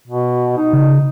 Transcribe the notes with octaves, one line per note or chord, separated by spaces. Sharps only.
B2
D#4
C#3